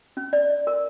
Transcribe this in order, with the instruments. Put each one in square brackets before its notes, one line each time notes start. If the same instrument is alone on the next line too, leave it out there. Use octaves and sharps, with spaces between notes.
[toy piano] C#4
D5
A#4